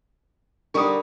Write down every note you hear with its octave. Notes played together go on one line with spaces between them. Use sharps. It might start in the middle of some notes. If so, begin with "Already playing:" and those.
D3 G3 A#4 C#6 D#6